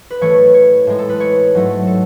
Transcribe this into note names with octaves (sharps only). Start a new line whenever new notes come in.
B4
A2 E3 A3 C#5
C#5
A2 G#3
A4
B4
C#5
G#2 F#3 A3
A4